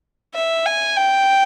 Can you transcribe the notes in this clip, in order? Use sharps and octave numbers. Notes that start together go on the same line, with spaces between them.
E5
G#5
G5